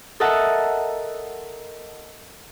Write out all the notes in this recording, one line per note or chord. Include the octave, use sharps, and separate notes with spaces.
A4 A#4 D#5 E5 F#5 A5